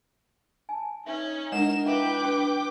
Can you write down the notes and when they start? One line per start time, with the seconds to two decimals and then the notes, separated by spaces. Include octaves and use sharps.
0.69 G#5 A5
1.06 C#4 D#4 B4 C#5 E5
1.52 G#3 D4 E4 A#4 D#5 F#5 E7
1.86 E4 B4 E5 F5 G5 D6
2.24 D4 F#4